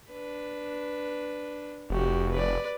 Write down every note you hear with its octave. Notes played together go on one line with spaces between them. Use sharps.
D4 B4
F1 F#4 G4
B4 D5